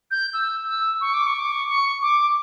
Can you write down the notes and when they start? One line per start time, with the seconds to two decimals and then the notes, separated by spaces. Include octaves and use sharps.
0.11 G6
0.34 E6
0.67 E6
1.01 C#6
1.14 D6
1.27 C#6
1.39 D6
1.52 C#6
1.69 C#6
2.02 D6